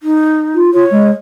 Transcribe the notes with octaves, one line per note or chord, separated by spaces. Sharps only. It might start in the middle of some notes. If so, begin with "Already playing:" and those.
D#4
F4
F4 C#5
G#3